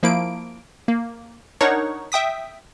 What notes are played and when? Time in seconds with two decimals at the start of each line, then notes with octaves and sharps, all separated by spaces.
0.03 F3 A#3 E4 D7
0.88 A#3
1.61 D4 D#4 A#4 C#5 F#5 C#6
2.12 E5 G5 D#6 B6